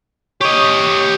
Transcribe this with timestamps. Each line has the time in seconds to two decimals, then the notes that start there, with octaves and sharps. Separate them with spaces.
0.41 G4 C#5 D#5